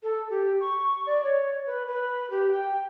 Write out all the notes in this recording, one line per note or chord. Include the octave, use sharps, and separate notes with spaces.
A4
G4
C#6
D5
C#5
B4
B4
G4
G5